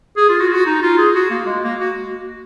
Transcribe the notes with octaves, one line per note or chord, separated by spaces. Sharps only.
G#4
F4
F#4
F4
F#4
D#4
F4
G#4
F#4
A#3
G#3
A#3
F#4